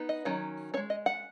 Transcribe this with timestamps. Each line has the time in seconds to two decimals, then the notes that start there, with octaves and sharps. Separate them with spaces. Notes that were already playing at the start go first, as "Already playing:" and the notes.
Already playing: B3 D#4
0.09 D#5
0.25 D#3 F#3 C#4
0.74 C#4 C#5
0.77 G#3
0.90 D#5
1.06 F#5